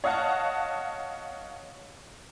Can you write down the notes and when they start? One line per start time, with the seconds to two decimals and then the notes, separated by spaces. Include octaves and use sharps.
0.04 C#5 D#5 F5 F#5 A5